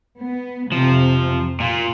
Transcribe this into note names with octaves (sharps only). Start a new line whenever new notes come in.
B3
F2 C3 F3
A#2 F4